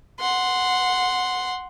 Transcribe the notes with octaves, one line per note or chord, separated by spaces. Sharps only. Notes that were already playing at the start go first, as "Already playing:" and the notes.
F#5 C6